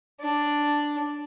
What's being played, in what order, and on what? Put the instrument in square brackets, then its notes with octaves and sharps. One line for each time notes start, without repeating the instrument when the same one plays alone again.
[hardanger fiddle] D4